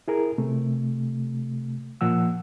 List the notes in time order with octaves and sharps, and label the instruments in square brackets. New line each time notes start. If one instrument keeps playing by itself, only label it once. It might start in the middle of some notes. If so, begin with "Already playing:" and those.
[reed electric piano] E4 G#4 A#4
C3 A3
A#2 F3 F#5 E6